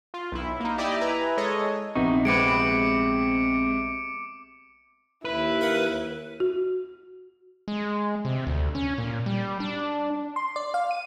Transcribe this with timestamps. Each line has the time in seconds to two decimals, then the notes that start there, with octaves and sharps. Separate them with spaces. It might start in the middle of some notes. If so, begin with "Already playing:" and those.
0.14 F4
0.32 B1 E4
0.60 A#3 D#4
0.78 E4 G4 D5 D#5
1.01 E4 B4 G#5 A#5
1.37 G#3 A4 C#5 D#5
1.95 A#1 C3 B3 D#4 C#6
2.25 G#3 C4 B4 D6 C#7 D7
5.25 D#2 E4 B4
5.61 A#4 F5 F#5
6.40 F#4
7.68 G#3
8.25 C3
8.47 D2
8.75 C#4
8.98 A#2
9.26 G3
9.60 D4
10.36 C6
10.56 D5
10.74 F5
10.91 D#7